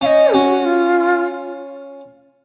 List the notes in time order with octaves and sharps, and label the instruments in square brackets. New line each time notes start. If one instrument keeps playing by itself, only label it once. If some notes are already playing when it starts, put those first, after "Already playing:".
[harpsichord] C#4 [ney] F5
[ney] D#5
[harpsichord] C#4 [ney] F#4
[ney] F4